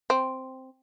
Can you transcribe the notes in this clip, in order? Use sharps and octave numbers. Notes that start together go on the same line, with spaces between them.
C4